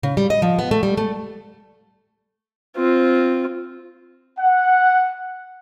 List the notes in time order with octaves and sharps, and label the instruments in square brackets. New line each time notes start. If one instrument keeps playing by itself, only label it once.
[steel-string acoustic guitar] C#3
G3
D#5
F3
B3
A3
G3
A3
[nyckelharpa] C4 F4
[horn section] F#5